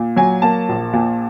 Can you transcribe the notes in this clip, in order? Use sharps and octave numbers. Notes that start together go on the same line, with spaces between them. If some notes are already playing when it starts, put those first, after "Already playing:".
Already playing: A#2
F#3 G#5
A#3 A5
A#1
A#2